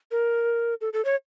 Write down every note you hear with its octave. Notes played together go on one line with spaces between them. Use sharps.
A#4
A4
A4
C#5